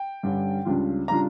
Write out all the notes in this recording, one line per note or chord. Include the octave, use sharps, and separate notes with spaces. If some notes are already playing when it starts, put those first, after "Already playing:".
Already playing: G5
G2 D3 G3 C#4
C#2 C#3 G3 D4 F4
C#3 G3 D4 F4 A#5